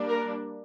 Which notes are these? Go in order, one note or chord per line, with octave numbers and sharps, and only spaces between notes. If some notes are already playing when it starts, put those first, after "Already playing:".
Already playing: G3 A#3 D4
A#4